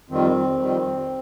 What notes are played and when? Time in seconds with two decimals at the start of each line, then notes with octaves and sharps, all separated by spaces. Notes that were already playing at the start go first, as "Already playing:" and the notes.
0.10 F2 D#3 G3 C4
0.59 F2 D#3 G3